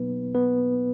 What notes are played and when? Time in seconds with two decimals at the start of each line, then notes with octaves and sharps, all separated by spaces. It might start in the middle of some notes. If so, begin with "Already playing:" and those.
Already playing: B2 F#3 A#3 B3 D#4 B4
0.35 B3 B4